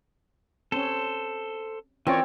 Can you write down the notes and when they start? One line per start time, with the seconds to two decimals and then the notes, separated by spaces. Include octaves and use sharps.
0.72 C4 C#4 A4 C5
2.07 E3 C4 C#4 F4 A#4 C#5 D5